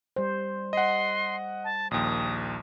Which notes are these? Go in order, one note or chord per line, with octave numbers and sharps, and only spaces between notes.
G3 C5
D#5 F#5 C6
A5
A#1 D#2 D#6